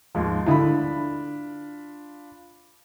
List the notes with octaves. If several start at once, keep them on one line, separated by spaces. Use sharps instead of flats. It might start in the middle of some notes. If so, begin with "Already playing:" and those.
D#2 G#2 F3
D3 D4 E4 F4 B5